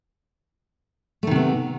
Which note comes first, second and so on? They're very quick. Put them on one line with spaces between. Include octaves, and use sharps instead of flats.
A3 D#3 C3 B3